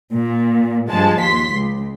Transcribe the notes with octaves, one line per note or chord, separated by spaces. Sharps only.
A#2
G2 F3 G#3 A5
D#2 C6 B6
C#2